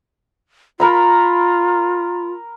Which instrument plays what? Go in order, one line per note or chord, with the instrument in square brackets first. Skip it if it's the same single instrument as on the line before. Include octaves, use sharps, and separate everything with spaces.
[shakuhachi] F4 [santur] A#4 A#5 B5